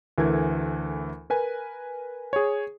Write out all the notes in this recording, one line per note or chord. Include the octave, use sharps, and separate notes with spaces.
D2 E3 A3 A#4 G#6
A#4 B4 G#5
G#4 C#5